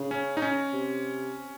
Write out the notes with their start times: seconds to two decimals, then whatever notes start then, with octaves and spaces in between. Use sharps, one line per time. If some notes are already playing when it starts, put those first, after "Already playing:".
Already playing: C#3
0.11 C#4
0.37 D#4
0.42 C#4
0.73 C3